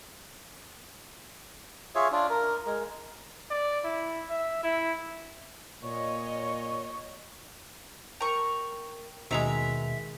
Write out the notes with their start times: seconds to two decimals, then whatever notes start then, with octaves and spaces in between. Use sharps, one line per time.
1.95 F4 G#4 C#5 E5
2.12 D4 F4
2.30 A#4
2.66 G#3 A#4
3.51 D5
3.85 E4
4.30 E5
4.63 E4
5.83 A#2 C#5 D#5 C#6
8.21 A#4 G5 A#5 C#6
9.31 D#2 B2 D#3 G#3 E5 A#5